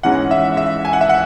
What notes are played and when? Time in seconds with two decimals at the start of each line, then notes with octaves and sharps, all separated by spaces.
0.03 G#2 E3 G#3 C#4 F#5
0.31 E5
0.57 E5
0.85 G#5
0.93 F#5
1.01 E5
1.09 F#5